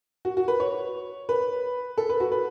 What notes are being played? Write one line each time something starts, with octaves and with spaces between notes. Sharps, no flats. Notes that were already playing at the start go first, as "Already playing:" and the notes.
F#4
F#4
B4
C#5
B4
A4
B4
F#4
B4